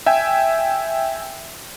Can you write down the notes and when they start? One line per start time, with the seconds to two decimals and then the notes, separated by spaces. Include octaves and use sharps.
0.06 E5 G5 G#5